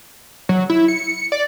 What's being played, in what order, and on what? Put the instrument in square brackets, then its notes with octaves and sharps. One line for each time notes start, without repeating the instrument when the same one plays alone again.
[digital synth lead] F#3
E4
C#7
D5